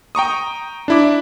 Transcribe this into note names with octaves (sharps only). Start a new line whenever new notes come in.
G5 A#5 C#6 D#6
D4 E4 D6